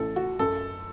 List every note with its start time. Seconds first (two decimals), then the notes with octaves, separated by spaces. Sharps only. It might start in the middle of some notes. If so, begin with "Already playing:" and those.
Already playing: A1 E3 A4
0.16 F#4
0.39 F#2 A4